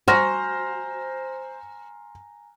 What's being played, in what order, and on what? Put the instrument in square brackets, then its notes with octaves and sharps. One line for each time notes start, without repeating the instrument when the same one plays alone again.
[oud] F#4 [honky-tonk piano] C5 [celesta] G#5 A#5 [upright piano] C6 F6 A#6